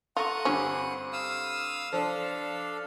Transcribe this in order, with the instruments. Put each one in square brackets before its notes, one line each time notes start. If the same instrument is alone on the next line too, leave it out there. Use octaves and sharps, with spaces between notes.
[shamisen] F4 [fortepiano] A4 A#5 C#6 [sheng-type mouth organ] F#5 D#6
[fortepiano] G2 D3 C4 [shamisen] C#4
[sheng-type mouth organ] F5 D#6 E6
[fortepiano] F3 [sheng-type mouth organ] D4 A4 F5